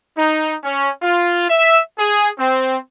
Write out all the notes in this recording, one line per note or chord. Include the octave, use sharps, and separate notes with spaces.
D#4
C#4
F4
E5
G#4
C4